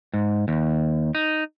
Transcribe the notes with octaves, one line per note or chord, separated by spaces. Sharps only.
G#2
D#2
D#4